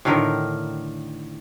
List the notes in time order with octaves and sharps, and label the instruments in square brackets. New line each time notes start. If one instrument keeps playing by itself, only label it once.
[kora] A2 D3 D#3 A#4